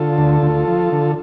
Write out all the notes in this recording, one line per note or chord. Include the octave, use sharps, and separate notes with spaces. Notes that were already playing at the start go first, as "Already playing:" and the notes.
Already playing: D3 F4 A4
D2
D2
F3
D3